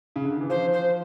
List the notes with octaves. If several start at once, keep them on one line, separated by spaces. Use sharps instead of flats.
C#3
D3
D#3
E3
F3 C5
C5